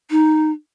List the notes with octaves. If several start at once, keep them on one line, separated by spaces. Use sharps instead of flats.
D#4